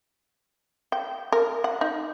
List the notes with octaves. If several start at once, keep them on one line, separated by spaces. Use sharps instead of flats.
G5
A#4
F#5
D#4